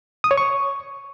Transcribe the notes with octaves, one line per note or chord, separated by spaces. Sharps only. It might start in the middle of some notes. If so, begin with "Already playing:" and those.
D#6
C#5
C#6